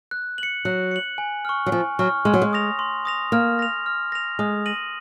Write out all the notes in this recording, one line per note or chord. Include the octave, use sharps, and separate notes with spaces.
F#6
C#7 F#7
F#3 F#6
C#7 F#7
G#5
C#6 F6
F#3
F3 G#5
F#3 C#6 F6
G#3 C6
F#3
G#3
D#6 A#6 F7
C6
D#6 A#6 F7
A#3 F6
A#6 F7
F6
A#6 F7
G#3 D#6
A#6 D#7 F#7